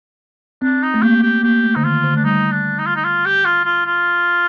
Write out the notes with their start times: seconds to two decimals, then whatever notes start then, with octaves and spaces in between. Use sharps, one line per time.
0.62 C4 D4
0.82 D#4
0.94 A3
1.02 A#3 G4
1.22 G4
1.43 A#3 G4
1.63 A3
1.75 D3 D#4
1.83 D#3 F4
2.04 D3
2.14 A3 D4
2.24 G3 D#4
2.51 D4
2.78 D#4
2.86 F4
2.95 D#4
3.04 F4
3.25 G4
3.44 F4
3.65 F4
3.86 F4